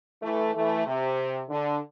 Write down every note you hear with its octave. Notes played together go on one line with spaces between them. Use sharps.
E3 A3
E3 A3
C3
D3